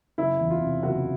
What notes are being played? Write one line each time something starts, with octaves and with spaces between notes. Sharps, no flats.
F#1 E4
E2
F4
C3
F#1 F#4